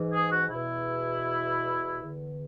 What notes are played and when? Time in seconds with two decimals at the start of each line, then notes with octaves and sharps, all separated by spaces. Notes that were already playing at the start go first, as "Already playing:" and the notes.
Already playing: G#2 E3
0.12 G#4
0.31 F#4
0.50 E2 B2 E4
2.01 E2 D3